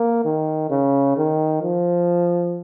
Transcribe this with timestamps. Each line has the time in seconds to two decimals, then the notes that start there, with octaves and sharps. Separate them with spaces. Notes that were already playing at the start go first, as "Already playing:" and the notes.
Already playing: A#3
0.25 D#3
0.70 C#3
1.17 D#3
1.63 F3